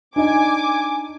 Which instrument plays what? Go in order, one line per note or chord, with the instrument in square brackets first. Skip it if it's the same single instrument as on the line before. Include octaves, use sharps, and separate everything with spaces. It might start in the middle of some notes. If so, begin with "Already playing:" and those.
[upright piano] D4 D#4 [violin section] G#5 D6